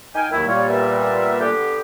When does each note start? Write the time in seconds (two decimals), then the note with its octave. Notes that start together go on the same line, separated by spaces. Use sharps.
0.15 D#4 F5 G5 G#5
0.31 D#2 D#3 F#3 E4
0.47 A#2 G3 F4 C#5
0.69 B3 A#4 E5
1.40 D3 B3 G4